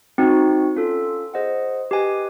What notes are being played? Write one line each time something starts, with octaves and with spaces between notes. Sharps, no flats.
C4 D#4 F#4
C#4 F4 A4
G#4 C5 D#5 F#5
G4 B4 D#5 G#5